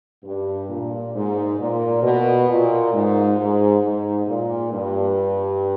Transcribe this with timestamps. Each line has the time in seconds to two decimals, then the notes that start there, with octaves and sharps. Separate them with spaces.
0.24 G2
0.69 A#2
1.13 G#2
1.58 A#2
2.02 B2
2.48 A#2
2.92 G#2
3.37 G#2
3.81 G#2
4.26 A#2
4.71 G2